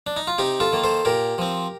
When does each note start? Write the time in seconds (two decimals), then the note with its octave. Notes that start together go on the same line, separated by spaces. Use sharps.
0.07 D4
0.17 D#4
0.27 F4
0.38 C3 D#4 G4
0.60 F4 A4
0.73 D#3 A#3
0.84 A4 C5
1.05 A#2 G4 A#4
1.38 F3 C4